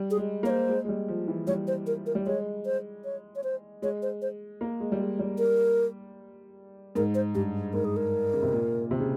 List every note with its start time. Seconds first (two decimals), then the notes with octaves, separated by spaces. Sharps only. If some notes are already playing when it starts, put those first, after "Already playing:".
Already playing: G3
0.10 G#4
0.17 G#3
0.43 A#3 C#5
0.50 C5
0.69 G#3
0.85 G#3
0.89 G3
1.08 F3
1.28 E3
1.47 G3 C#5
1.67 C5
1.87 A#4
2.06 A#4
2.15 G3
2.26 G#3 C#5
2.66 C5
3.04 C#5
3.36 C#5
3.44 C5
3.82 G#3 C#5
4.02 C5
4.22 C5
4.61 A#3
4.80 G#3
4.92 G3
5.00 G#3
5.19 G3
5.38 A#4
6.95 G#2 A#4
7.15 C5
7.35 G2 G4
7.74 G#2 A#4
7.85 G#4
7.97 A#4
8.33 C#3
8.43 C3
8.52 A#2
8.91 C3
9.00 C#3